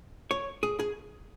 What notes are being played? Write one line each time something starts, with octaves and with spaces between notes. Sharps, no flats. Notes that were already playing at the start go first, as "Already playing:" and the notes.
C#5
G#4
G#4